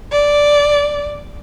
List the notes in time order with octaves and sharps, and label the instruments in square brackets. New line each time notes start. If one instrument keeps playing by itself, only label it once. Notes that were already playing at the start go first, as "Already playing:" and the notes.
[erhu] D5